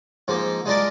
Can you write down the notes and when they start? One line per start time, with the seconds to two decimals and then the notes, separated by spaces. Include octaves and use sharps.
0.28 G#2 F3 A#3
0.66 G#3 D4 F4 A#4 D5